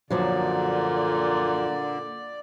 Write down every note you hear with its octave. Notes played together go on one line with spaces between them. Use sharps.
F#2 A#2 D3 F3 F#3 D5